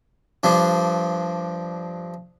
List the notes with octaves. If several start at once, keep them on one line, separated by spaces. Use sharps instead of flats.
G2 F3 D4